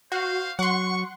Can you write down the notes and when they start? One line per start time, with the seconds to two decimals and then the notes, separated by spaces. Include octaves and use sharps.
0.12 F#4 C5 F5
0.59 F#3 F#5 C6 C#6